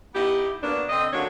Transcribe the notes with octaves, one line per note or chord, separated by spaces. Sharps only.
B3 D#4 E4 G4
F#3 A#3 B3 D4
D3 C4 D4 D#5
D3 F#3 A3 A#3 D4 C#5